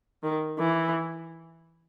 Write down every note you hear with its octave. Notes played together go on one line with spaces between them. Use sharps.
D#3
E3